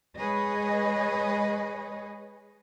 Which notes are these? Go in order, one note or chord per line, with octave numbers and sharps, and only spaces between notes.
G#3 G#4 B4 C#5 D#5